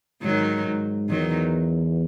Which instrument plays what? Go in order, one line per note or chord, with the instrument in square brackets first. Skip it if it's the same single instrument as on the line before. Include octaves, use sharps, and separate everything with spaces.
[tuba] G#2 [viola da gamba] D#3 F#3
[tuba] G#2
[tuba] E2 [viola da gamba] D#3 F#3